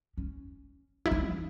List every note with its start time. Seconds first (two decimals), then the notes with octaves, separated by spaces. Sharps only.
0.18 C#4
1.05 E4
1.11 D#4
1.28 E3